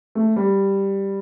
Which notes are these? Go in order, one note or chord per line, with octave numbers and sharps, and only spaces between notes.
A3
G3